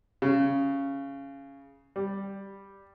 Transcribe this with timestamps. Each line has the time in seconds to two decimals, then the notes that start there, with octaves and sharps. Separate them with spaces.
0.22 C#3
1.96 G3